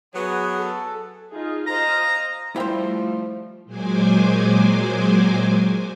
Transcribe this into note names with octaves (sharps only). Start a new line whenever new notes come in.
F#3 B3 G#4
A4
D#4 F4 G#4
C5 D#5 F5 A#5
C#3 F3 G3 A3 E4 F4 C5 G5
A#2 F#3 G#3 C5 G#5 D6